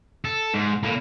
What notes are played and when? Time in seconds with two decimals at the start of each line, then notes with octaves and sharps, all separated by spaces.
0.25 A4
0.54 G#2
0.83 A2 A#3